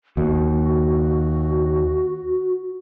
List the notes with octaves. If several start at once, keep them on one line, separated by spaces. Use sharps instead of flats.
D#2 F#4